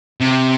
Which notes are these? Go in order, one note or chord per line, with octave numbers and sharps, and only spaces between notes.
C3